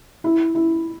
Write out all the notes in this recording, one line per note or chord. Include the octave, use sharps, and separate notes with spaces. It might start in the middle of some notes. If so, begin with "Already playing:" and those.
E4
E4